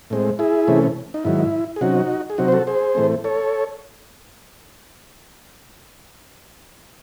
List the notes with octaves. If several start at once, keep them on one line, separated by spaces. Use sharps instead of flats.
A2 G#3 C4
E4 G#4
C3 E3 A3 C#4
D#4
G#2 D#3 F#3 E4
G#4
C3 F#3 C#4 D#4 F#4
G#4
C3 F#3 C4 D#4 F#4
C5
F#4 A4
G#4 C5
A2 E3 A3 C4
A4 C#5